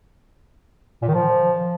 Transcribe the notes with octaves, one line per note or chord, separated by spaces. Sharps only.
A#2
D#3
F3